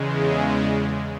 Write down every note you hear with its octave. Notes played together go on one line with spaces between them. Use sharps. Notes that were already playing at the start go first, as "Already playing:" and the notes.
Already playing: E2 C#3 G#3
E5
D5